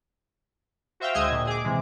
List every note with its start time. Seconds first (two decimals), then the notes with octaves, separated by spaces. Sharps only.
1.00 F#4 C5 E5 F5 G5
1.14 D2 G#3 D#5 E6 G#6
1.31 A#2
1.47 G#4 D6
1.64 C3 E3 G#3